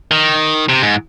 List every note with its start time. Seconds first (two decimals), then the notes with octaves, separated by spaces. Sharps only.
0.11 D#3
0.69 C3
0.83 G#2